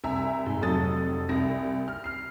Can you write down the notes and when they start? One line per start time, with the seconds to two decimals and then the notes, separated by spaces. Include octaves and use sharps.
0.04 C2 E5 G#5 A#5
0.46 G#2
0.61 F1 F2 F#3 A4 D#6 A6
1.29 C2 A#6
1.88 F6
2.04 F6 C7